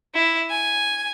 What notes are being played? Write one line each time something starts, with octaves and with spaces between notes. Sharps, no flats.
E4
G#5